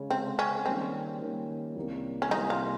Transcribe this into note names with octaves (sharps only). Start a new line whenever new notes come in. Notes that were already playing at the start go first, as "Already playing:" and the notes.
Already playing: C#3 G#3 C#4
C#3 G#3 C4 C#4
C#4
D#3 G3 A#3 C4 C#4
D#3 G3 A#3 C#4
C2 C3 G3 A#3
C#4
C2 C3 G3 A#3 D#4
F4